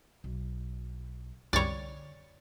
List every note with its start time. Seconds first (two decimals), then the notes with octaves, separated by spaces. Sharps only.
0.24 B1
1.53 C2 F#2 D3 G3 C#5 D5